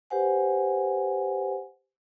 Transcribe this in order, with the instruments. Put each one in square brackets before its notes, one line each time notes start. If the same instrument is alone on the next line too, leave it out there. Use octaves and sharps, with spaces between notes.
[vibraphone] G4 B4 C5 F#5 G#5